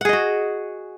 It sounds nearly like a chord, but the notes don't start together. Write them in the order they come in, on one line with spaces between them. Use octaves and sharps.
F#5 G#4 D#5 F#4